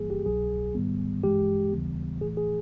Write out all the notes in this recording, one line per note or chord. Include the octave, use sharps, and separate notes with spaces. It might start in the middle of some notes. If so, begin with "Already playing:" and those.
Already playing: G#1 G2 E3 G3 A#3 G#4
G4
C2 B2 F#3 G#4
G#2 D#3 G3 B3
G2 E3 G#3 G4
D#2 C#3 E3 G3 B3
A2 E3 A3 G#4
G#4